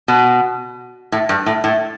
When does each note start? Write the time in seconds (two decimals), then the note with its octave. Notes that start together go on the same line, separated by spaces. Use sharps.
0.08 B2
1.12 A2
1.29 G2
1.46 A2
1.64 A2